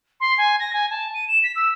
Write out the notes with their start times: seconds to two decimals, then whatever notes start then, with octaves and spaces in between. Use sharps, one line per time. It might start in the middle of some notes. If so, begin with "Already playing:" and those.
0.20 C6
0.38 G#5
0.60 A#6
0.73 G#5
0.90 A5
1.14 D#7
1.28 E7
1.43 B6
1.56 E6